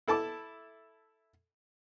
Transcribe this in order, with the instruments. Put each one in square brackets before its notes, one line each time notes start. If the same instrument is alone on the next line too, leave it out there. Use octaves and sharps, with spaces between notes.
[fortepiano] E4 A4 A5 D6